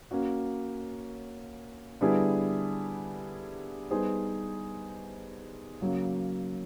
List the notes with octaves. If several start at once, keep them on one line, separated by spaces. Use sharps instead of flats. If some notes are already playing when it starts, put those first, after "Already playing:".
A#3 C#4 F#4
D3 G3 B3 E4 G#4
G3 B3 D#4 G#4 C5
C#3 F#3 A#3